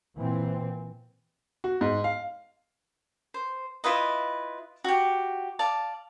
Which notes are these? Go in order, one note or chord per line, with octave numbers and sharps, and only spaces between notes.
A#2 E3 C4
F#4
G#2
F5
C5
E4 F4 B4 D#5
F#4 G4
D5 F5 A5